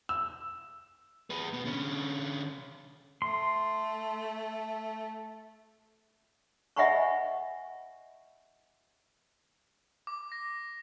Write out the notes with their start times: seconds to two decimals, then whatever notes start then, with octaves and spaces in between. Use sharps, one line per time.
0.09 E6
1.30 G#4 B4
1.53 B2 B3
1.65 D3 C#4
3.22 A3 C6
6.76 D#5 E5 F#5 G#5 B5 C#6
10.07 D6
10.32 A#6